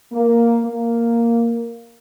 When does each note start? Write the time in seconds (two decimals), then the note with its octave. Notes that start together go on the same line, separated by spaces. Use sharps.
0.12 A#3
0.66 A#3